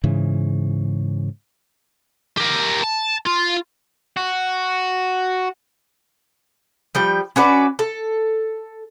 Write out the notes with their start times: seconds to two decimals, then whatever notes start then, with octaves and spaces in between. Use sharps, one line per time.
0.04 G#2 C#3 E3
2.38 G4 A#4
2.84 A5
3.27 F4
4.17 F#4
6.95 F3 G3 G5
7.36 C#4 F#4 B4 D5
7.79 A4